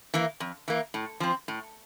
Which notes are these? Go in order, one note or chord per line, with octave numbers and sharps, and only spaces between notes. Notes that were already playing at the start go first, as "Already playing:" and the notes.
E3 A#3
F2
E3 A#3
A2
F3 C4
A2